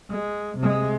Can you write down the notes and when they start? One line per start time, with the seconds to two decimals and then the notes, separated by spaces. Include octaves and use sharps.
0.10 G#3
0.58 C3 G#3